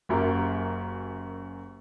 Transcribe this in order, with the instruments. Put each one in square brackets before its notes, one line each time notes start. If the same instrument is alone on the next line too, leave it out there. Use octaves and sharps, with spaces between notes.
[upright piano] F#1 F#2 G4 A#4